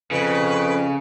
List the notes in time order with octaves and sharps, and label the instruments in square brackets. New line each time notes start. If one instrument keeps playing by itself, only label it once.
[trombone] F2 [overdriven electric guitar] C#3 [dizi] B4